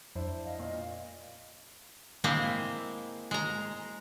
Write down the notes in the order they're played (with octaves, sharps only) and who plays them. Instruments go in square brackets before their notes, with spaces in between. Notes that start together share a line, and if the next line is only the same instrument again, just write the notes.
[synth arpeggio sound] F2 [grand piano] D4 E4 C5
[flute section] D#5 F5
[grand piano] A#2
[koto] G#3 A#3 C4 E4
G#3 A#5